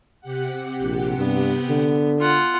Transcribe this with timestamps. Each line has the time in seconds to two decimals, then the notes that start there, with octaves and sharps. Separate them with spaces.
0.21 C3 G4 F#5
0.82 A#1
1.18 G2 B3
1.70 D3
2.18 F4 F#5